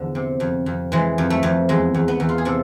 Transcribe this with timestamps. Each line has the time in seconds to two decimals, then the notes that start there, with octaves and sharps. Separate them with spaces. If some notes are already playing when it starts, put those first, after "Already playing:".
Already playing: E2 D3 F3
0.15 C3
0.40 F2
0.66 F2
0.92 E3 G#3
1.18 F2
1.30 A3
1.43 F2
1.69 E2 G#3
1.94 E2
2.08 B3
2.20 E2
2.29 F4
2.38 G#4
2.45 C3 A4